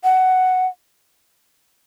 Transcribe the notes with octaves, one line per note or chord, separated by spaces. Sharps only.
F#5